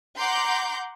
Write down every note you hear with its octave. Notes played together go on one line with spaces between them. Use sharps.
F#5 A#5 C6 D6 G6